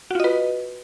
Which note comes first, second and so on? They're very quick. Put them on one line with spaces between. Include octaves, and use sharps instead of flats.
F#4 F4 D#5 B4